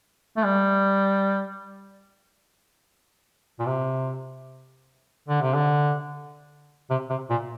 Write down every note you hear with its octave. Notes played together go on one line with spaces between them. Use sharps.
A3
G3
A#2
C3
D3
C3
D3
C3
C3
A#2